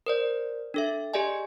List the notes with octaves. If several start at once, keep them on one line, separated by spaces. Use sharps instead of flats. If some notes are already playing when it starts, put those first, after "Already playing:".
A#4 C5 D5
D4 A4 E5
G4 G#4 D5 D#5 G#5